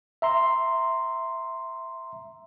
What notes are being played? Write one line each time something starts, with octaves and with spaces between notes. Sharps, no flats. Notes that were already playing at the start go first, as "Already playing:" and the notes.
E5 A#5 C6